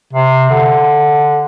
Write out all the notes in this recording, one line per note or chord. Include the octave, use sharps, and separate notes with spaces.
C3
D3